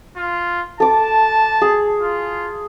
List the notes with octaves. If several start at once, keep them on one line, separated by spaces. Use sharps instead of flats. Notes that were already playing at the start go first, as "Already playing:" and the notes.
F4
A4 A5 D6
G#4
F4